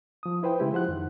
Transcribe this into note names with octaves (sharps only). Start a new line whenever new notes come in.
F3 D#6
E4 B4 C5 G5
C#3 G#3 E4 G4
F3 C5 F#5 F#6
F2 D#3